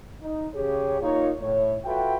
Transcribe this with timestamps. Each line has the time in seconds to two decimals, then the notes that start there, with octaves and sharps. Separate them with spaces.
0.22 D#4
0.54 C#3 G4 G#4 C#5
1.00 A#3 D#4 F4 C#5
1.40 A2 C#5
1.85 F4 F#4 A4 B4 E5 G5